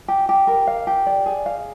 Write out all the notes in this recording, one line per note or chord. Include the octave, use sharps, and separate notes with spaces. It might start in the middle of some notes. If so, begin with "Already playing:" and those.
G4
G4
A#4
F5
G4
D5
G#4
F5